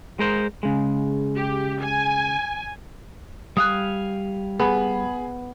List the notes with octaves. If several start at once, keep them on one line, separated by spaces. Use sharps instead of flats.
G#3 A#4 C5
C#3 G#3
G4
G#5
G3 F5 G#5 D#6 F#6
B3 G#4 B5